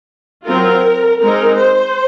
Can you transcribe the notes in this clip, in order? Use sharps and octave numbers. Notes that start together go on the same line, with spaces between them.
F#3 C4 F4 A#4
G#3 C4 D#4 A#4
C5